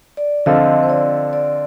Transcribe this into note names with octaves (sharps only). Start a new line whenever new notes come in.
D5
D3 F3 C4 F4 A4 D#5
C5
D5
D5